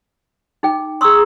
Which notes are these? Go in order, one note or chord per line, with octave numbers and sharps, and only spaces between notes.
D#4 G#4 G5
G#4 A#5 C6 C#6 D#6 E6